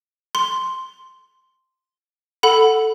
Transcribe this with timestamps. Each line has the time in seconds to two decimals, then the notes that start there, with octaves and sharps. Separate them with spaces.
0.35 C6
2.43 A4 F#5 B5